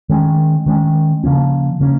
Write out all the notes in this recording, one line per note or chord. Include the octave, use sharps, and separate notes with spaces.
D#3 G#3 C#4
D#3 G#3 C#4
C#3 F3 A#3 C#4
C#3 A#3 C#4